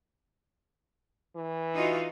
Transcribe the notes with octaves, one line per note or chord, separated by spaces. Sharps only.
E3
D#4 F4 F#4